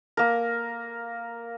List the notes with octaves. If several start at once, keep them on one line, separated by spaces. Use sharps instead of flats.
A#3 A#4